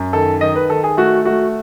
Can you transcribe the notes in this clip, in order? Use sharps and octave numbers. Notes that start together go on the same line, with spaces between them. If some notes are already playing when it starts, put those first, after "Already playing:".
Already playing: F#2
D#3 A4
D#3 D#5
B4
D#3 A4
G#4
A3 F#4
A3 F#4